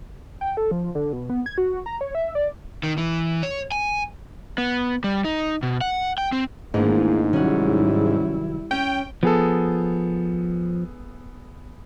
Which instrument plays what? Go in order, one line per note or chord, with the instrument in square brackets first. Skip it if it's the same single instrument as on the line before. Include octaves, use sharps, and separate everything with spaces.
[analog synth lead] G5
A4
F3
D3
B2
B3
G#6
F#4
A#5
C#5
E5
D5
[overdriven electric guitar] D#3
E3
C#5
G#5
[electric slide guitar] B3
G3
D#4
B2
F#5
G5
C4
[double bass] G#1 A#3 [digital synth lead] G#2 [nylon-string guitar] E3 F3 [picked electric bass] A3 D4
[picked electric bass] C3 D#3 F#3 [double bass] G3 E4 [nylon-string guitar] C#4 F#5
[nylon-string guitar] C#4 [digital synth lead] G5
[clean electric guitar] F3 [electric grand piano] B3 G#4 A4